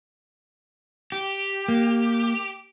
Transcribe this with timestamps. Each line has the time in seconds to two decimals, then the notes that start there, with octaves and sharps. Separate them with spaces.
1.12 G4
1.68 A#3